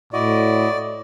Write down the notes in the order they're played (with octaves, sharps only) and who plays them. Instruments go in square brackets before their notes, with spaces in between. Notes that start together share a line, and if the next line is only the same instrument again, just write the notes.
[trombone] A2 [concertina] E4 F#4 D#5 [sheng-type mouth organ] D5